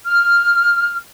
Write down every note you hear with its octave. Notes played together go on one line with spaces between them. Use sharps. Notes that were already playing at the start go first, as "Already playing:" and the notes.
F6